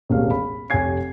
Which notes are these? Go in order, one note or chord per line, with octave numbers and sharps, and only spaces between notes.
E1 A1 D#2 A#3 F5
B5
F1 G4 C#5 G#5 G#6 C7